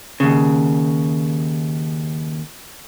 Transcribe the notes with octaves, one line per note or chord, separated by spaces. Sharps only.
D#2 C#3